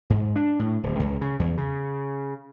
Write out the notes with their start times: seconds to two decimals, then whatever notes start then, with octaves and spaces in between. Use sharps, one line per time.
0.10 G#2
0.36 D4
0.59 A2
0.83 D1
1.00 C#2
1.21 C#3
1.39 E2
1.57 C#3